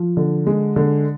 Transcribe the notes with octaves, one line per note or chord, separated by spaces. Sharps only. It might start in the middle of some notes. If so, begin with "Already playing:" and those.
Already playing: F3
D3
G#3
D3